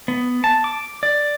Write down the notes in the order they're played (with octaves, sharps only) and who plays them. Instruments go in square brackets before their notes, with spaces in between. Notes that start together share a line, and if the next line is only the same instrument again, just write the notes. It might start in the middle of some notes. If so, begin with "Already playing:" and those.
[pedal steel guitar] B3
A5
D6
D5